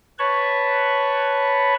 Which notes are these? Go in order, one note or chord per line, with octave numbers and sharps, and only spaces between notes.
B4 C#5 A5 B5 C#6